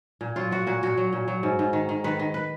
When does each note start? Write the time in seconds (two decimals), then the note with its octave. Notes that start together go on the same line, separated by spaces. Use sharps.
0.21 A#2
0.36 F#3 F4
0.51 F#3 F#4
0.67 A#2 F#4
0.83 A#2 F#4
0.97 F#3
1.13 A#2
1.28 F#3
1.43 G#2
1.59 G#2
1.73 D#3
1.89 D#3
2.04 D#3 B4
2.19 D#3
2.34 B4